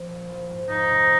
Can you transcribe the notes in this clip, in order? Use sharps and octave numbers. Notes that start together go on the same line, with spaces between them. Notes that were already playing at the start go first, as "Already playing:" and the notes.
Already playing: F3
A#1
F3
G#2
F2 D#4
C3